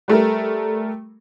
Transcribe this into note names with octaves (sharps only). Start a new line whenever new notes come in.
G3 A3 A#4